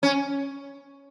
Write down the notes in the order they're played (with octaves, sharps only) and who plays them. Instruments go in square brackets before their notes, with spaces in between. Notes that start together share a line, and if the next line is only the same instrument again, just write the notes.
[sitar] C#4